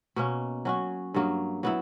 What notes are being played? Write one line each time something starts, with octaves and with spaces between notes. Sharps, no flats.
B2 A#3 C#4
F#3 C#4 F#4
G2 F#3 A#3
F#3 B3 E4